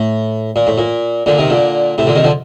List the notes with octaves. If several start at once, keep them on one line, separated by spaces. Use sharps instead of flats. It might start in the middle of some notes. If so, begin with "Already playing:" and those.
Already playing: A2
A#2
A2
A#2
A#2 D3
C3 D#3
A#2 D3
A2 C3
A#2 D3
C3 D#3
D3 F3